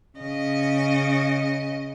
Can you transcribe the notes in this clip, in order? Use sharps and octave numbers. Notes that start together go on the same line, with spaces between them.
C#3 D#5